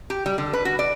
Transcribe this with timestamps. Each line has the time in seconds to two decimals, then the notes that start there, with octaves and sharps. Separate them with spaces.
0.10 G4
0.26 G3
0.38 D3
0.53 B4
0.65 F#4
0.79 D5